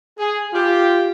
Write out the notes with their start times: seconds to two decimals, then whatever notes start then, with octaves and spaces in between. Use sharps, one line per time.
0.18 G#4
0.54 F4 G4